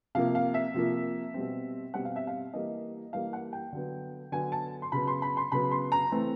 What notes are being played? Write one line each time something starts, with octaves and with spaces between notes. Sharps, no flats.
C3 F3 A#3 F5
F5
E5
C3 F3 A#3
B2 G3 C4
B2 G3 C4 F#5
F5
E5
F5
E3 G3 A#3 D#5
E3 G3 A#3 F5
F#5
G5
D3 F#3 B3
D3 F#3 B3 G#5
A5
C6
C#3 F#3 B3 B5
C6
B5
C6
C#3 F#3 B3 B5
C6
A#5
E3 A3 C4